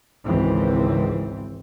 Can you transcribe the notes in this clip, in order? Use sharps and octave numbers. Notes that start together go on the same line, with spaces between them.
G#1 C#2 E3 C4